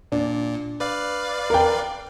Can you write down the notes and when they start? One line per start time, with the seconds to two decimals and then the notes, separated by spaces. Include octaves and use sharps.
0.12 A#2 D4
0.80 B4 D5 F5
1.50 A#4 G5